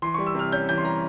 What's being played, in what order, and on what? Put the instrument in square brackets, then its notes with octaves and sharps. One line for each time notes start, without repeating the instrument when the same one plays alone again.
[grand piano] E3 C6
G3 C#6
E6
C3 F6
C#4 G6
E3 G6
C6
G3 A#5